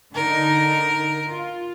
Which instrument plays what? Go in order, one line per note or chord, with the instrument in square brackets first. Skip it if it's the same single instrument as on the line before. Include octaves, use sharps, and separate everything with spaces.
[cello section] D3 D#4 [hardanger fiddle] A#4
[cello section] F4